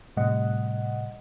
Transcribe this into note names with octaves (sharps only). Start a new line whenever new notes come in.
A2 C3 G3 D#5 F#5